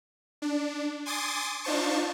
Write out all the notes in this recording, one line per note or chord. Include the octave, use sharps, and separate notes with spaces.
D4
G#5 C6 D6 D#6 A6
D4 D#4 F4 C5 A5 C#6